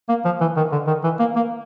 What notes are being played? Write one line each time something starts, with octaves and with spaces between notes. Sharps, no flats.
A#3
F3
E3
D#3
D3
D#3
E3
A#3
A#3